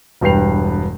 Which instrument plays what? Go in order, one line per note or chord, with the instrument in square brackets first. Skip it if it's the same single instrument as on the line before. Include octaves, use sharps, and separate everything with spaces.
[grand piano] E1 G2 B4 G5 C7 F7